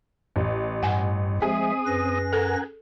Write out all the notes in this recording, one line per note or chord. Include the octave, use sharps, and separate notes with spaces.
A1
G2 F#5 G#5
F3 G#3 C4 G#4 E5 D#6
F#2 B4 A#6
A4 A#4 F#5 G#5